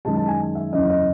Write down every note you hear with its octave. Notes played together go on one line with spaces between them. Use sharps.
F#2 D#3 G#3 A5
A5
G#5
E5
F#1 E2 C#3 D#5
D#5